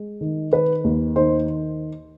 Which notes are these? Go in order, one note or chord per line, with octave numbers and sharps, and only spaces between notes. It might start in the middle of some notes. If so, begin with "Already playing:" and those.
Already playing: G#3
D#3
D#3 B4
D#2
D#3 C5